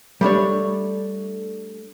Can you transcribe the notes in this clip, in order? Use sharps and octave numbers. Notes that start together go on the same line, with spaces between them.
G3 A3 D4 C#5